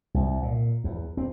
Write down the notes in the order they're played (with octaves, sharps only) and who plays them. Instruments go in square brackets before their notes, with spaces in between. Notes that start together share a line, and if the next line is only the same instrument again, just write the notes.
[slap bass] C2
A#2
E2
C4